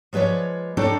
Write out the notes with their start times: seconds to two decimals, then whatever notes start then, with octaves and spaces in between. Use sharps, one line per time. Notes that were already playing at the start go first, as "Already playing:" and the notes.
0.13 F3 G#3 B4 C#5 D5
0.77 D4 D#4 A4 C#5 D5 G5